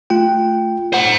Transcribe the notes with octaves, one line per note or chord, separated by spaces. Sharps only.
A3 F4 G5
C5 F#5